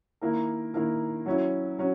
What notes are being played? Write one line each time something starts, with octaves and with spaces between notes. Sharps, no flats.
D#3 A#3 E4 A#4
D#3 A#3 E4 A#4
F#3 C#4 E4
F#3 C#4